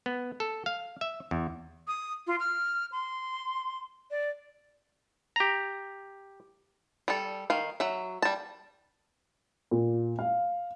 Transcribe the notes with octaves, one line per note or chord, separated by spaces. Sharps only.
B3
A4
F5
E5
E2
D#6
F4
F6
C6
D5
G4 A#5
G3 A4
D#3 F5
F#3 E5
G3 A5
A#2
F5